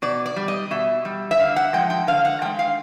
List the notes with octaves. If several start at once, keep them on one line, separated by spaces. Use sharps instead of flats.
B2 D5
D5
G3
D#5
B2 E5
G3
E5
D3 F5
F#5
F3 G#3 G5
G5
D3 F5
F#5
F3 G#3 G5
F5